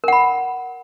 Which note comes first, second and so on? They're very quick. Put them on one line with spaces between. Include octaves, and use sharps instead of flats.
A#4 F#5 B5